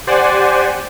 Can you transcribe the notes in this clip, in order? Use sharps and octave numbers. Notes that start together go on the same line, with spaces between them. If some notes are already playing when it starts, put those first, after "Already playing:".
G4 C5 D5 F#5 G#5